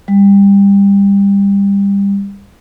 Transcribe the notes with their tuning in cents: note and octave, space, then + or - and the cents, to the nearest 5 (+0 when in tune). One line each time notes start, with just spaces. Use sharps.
G3 +25